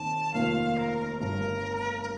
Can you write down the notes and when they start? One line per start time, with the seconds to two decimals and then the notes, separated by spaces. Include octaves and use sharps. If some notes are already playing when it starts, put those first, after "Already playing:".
Already playing: D#2 D#3 C4 A5
0.33 F1 D#2 D#3 A#3 F4 F5
0.77 A#4
1.20 G1 G2 D3 A#4
2.02 A#4